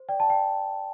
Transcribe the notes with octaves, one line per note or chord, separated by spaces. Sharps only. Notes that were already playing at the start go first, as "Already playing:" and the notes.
Already playing: C5
D5 G5
A5
D5 G5